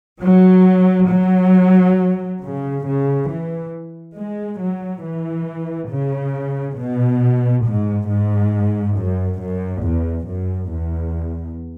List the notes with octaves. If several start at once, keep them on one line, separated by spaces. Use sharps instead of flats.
F#3
F#3
C#3
C#3
E3
G#3
F#3
E3
C#3
B2
G#2
G#2
F#2
F#2
E2
F#2
E2